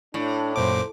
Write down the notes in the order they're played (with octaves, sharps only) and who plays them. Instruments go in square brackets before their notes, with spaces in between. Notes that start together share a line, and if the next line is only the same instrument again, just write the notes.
[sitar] A2 [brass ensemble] D4
[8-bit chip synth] F#2 A#2 D6 [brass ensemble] C5